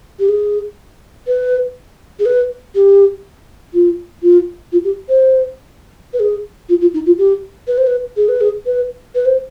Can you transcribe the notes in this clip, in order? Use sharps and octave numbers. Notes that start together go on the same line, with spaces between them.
G4
G#4
B4
G#4
B4
G4
F4
F4
F4
G4
C5
B4
G#4
F4
F4
D#4
F4
G4
B4
C5
B4
G#4
B4
G#4
B4
B4
C5